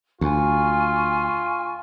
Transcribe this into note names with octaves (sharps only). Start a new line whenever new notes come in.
D2 F4 G#5 C#6